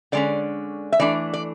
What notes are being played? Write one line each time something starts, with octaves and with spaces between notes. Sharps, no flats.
D3 G#3 C#4 D5
E5
E3 A3 D4 D5
D5